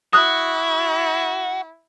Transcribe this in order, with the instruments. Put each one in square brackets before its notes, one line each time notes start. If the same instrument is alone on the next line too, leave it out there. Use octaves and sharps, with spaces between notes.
[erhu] E4 [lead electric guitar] F#4 [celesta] D#6 F#6